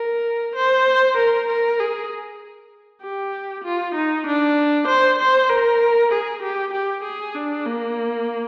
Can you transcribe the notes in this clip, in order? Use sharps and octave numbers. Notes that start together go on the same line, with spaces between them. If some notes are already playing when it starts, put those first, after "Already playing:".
Already playing: A#4
C5
A#4
A#4
G#4
G4
F4
D#4
D4
C5
C5
A#4
G#4
G4
G4
G#4
D4
A#3